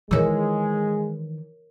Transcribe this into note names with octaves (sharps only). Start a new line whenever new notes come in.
D#3 E3 G#3 A#4 C#5 E6